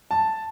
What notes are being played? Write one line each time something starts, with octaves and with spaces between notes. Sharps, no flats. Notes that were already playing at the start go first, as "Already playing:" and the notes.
A5